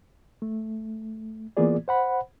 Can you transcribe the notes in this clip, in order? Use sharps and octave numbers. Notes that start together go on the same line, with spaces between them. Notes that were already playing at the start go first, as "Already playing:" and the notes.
A3
E3 A#3 B3 F4 G#4 D5
C5 F#5 B5